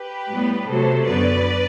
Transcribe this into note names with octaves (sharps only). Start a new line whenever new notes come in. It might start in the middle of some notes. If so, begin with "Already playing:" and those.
Already playing: G4 B4
A2 G3 B3
C3 F#3 A3 A4 C5
F#2 D3 F#3 B3 B4 D5